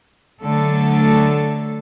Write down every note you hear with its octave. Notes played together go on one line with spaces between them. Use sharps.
D3 F#3 A3 A4